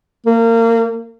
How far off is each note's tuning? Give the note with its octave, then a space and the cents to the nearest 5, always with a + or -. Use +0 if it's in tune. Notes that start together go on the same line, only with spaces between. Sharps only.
A#3 -25